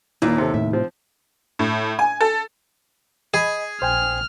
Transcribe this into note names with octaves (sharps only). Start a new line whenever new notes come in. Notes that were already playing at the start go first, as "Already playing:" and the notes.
D#2 A#2 E3
C3 A4
A2 C3 E5
F3 C4
A2
G#5
A4
G#4 D#5 G#5 B5
A#1 C5 G5 G#5 F6